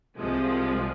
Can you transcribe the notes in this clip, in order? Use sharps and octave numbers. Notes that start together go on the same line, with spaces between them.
C2 C3 F3 G#3